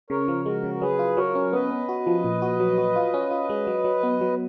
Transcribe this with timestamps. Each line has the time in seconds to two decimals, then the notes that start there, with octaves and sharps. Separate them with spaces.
0.10 C#3 A#4 C#5
0.28 F3
0.45 G#3 F#4 A#4
0.63 C#3
0.74 A#4
0.81 F#3 G#4 B4
0.99 F4
1.17 F#3 A#4 C#5
1.35 C#4
1.53 B3 B4 D#5
1.71 B3
1.89 F#4
2.06 F3
2.24 A#2
2.42 F#4
2.60 F#3
2.78 F#4
2.96 F4
3.14 C#4
3.31 F4
3.50 G#3
3.67 F#3
3.85 F#3
4.03 B3
4.21 F#3